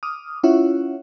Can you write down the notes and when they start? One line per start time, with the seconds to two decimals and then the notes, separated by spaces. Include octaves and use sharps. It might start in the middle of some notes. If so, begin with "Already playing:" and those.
0.03 D6 D#6 F6
0.43 C#4 E4 F4 C#5 E5 F#5